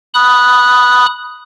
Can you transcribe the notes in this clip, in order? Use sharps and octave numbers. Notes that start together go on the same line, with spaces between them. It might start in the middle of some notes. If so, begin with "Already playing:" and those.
B5 D#6 F#6